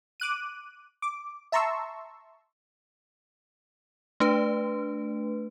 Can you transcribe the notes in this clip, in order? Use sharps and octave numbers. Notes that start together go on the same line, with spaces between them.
D6 F#6 D#7
D6
E5 A5 A#5 C6 C#6 E6
A3 D4 B4